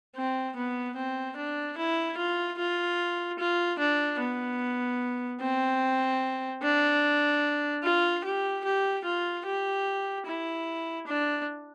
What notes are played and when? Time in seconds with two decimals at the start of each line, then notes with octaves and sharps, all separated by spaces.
0.16 C4
0.56 B3
0.96 C4
1.36 D4
1.77 E4
2.18 F4
2.58 F4
3.39 F4
3.79 D4
4.19 B3
5.41 C4
6.62 D4
7.83 F4
8.24 G4
8.64 G4
9.05 F4
9.45 G4
10.26 E4
11.07 D4